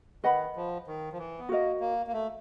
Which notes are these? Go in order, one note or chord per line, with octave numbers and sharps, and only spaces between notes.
D#3 B4 D#5 F#5 B5
F3
D#3
F3
E3
B3
A#3 F#4 A#4 D#5
A#3
A#3
A3